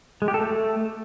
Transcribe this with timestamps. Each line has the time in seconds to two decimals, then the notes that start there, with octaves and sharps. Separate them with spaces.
0.22 G#3
0.28 G4
0.34 A4
0.40 A3